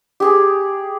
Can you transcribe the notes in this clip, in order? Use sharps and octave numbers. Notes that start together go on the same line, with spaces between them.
G4 G#4 G#5